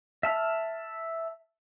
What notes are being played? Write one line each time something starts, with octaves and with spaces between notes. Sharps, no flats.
E5 A5 F6